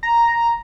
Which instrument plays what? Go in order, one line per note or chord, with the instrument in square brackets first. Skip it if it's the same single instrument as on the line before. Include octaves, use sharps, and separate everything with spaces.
[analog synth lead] A#5